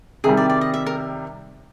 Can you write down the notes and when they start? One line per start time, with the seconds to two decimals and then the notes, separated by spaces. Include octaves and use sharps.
0.24 C3 D#3 G3 G#4
0.37 D5
0.50 D5
0.61 D#5
0.74 E5
0.86 A#4